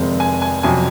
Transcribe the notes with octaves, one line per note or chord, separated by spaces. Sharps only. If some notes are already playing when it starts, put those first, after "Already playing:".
Already playing: F1 F2 D#3 G#3 C4
G#5
G#5
F2 C3 F#3 C#4 G#5